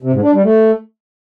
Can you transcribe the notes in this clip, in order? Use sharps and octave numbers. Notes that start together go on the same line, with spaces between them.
C3
G#2
D4
G3
A3